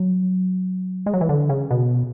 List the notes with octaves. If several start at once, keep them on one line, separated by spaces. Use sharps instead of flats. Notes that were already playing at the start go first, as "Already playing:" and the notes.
Already playing: F#3
G#3
F#3
E3
D3
C#3
B2